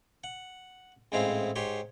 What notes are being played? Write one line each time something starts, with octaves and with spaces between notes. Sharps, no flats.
F#5
A1 G#2 G#3 C4 E4 F5
G#2 G4 C#5 C6